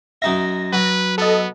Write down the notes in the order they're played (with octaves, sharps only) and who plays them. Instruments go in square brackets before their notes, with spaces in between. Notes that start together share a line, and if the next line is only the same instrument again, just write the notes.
[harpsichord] F#2 D#4 E5 [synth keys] A#6
[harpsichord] F#3 [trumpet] B4
[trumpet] B3 [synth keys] A4 D#5